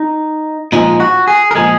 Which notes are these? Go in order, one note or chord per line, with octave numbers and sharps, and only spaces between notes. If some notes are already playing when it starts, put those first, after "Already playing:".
Already playing: D#4
A#2 F3 G#3 D#4
F#4
G#4
A#4
A#2 F3 G#3 G#4